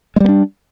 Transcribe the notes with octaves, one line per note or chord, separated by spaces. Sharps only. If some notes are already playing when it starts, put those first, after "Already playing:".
G3 G#3 B3 D4